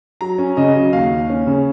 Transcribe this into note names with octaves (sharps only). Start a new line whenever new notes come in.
F#3 A#5
C#4
C#3 D#5
F#3
D#2 F5
D#2
C#4
C#3